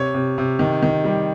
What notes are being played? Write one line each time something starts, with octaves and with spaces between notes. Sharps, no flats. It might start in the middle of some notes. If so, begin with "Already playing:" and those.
Already playing: C3 C#5
C3
C3
D#3
D#3
G3